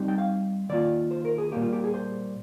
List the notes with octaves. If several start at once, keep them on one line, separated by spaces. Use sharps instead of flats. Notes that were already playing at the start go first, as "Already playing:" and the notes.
Already playing: G3 C4 D#4
G5
F5
D#3 A#3 F4 D5
C5
A#4
G#4
A#2 G3 A#3 G4
F4
G4
G#4
C5